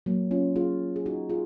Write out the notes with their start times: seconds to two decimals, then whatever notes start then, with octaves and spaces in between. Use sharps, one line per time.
0.06 F#3 A#3
0.31 C#4 F4
0.56 F4 G#4
0.96 G#4
1.06 D#4 F#4
1.30 F4 G#4